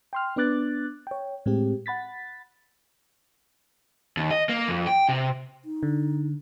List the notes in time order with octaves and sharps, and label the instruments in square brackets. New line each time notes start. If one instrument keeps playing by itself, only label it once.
[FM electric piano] G5 C6 F6
B3 D4 B4 D6 F#6 A6
C#5 G5
A2 G#3 C4 G4
F#5 B5 A6 B6
[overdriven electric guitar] D#2
D#5
A#3
F2
G5
C3
[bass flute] D#4
[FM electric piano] D3